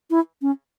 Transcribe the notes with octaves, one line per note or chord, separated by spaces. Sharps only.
E4
C#4